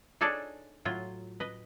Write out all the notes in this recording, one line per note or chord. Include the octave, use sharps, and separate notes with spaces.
D4 D#4 G#4 A4 C#5 D5
A2 F#3 F4
B4 D#5